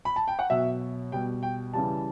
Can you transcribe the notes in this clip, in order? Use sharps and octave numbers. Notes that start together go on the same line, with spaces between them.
B5
A5
G5
F#5
B2 F#3 E5
B2 G3 G5
G5
C#3 E3 G3 A5